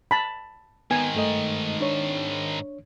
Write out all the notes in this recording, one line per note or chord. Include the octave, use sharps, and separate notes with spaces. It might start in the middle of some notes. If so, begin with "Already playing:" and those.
A5 B5
G#2 D#3 B3 G#5
G2 A3 D#5
D4 C#5